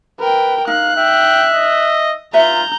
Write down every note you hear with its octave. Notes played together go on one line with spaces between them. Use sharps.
A#4 B4 G5
D#4 F5 F#6
E5 G5
D#5
F4 B4 E5 A#5 G6